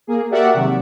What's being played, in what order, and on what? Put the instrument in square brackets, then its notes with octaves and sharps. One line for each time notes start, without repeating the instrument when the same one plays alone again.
[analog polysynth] A#3 G#4
F#4 G4 A#4 D5 E5 F#5
C3 D#3 F#3